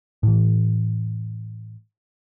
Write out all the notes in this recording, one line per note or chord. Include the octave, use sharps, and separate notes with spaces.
A2 E3